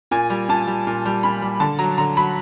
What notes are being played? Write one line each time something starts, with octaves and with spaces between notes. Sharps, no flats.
A#2 G#5
G3
A#2 A5
G3
A#2
G3
A#2 B5
G3
D3 A5
F#3 A#5
D3 A#5
F#3 B5